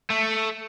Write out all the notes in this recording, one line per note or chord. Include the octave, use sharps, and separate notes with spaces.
A3